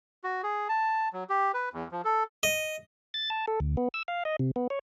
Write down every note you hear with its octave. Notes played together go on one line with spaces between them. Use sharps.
F#4
G#4
A5
F#3
G4
B4
E2
F3
A4
D#5
A6
A5
A4
D2
B3
E6
F5
D#5
C3
B3
C#5